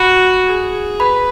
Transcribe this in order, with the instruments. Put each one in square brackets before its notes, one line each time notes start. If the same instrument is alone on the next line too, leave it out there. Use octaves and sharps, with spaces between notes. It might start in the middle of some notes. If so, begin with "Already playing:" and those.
Already playing: [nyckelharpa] F#4 [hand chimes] B5
[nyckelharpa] G#4
[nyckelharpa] B4 [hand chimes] B5